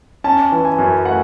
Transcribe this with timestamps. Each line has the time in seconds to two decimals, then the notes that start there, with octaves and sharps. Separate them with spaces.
0.24 C#4 A5
0.52 E3
0.65 G#5
0.79 F#2
1.05 A3 F#5